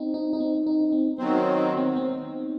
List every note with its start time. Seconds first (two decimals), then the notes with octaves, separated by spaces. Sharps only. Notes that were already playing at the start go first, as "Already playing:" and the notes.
Already playing: C4 D#4
0.14 D#4
0.33 D#4
0.40 C4
0.67 D#4
0.81 D#4
0.92 C4
1.18 D#3 F#3 B3 C4
1.38 D#4
1.57 D#4
1.77 C4
1.96 C4